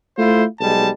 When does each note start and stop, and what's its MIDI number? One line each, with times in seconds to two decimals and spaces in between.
0.19 0.45 57
0.19 0.45 64
0.19 0.45 65
0.19 0.45 72
0.61 0.89 35
0.61 0.89 55
0.61 0.89 56
0.61 0.89 81